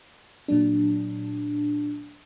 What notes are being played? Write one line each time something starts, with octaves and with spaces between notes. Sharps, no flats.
A#2 F#3 D4